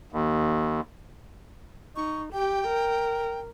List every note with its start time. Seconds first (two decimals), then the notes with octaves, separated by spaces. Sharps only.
0.12 D#2
1.96 D#4 C#6
2.33 G4 G5
2.67 A#4